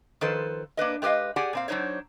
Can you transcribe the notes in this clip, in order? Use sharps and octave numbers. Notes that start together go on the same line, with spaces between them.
D#3 F3 A4 B4 C5
A#3 D4 B4 D#5
G#3 A3 G4 B4 D#5 F5
G4 G#4 D5 F#5 G#5
A#2 C4 F5
F#3 D4 D#4 C5 C#5